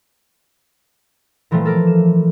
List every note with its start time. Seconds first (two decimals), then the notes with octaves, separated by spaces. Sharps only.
1.51 A#2 E3 F3 G3 A3 A#3
1.65 A4 A#4 D6
1.87 E7